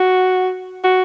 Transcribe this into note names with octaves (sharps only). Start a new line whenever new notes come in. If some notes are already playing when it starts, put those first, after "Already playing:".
Already playing: F#4
F#4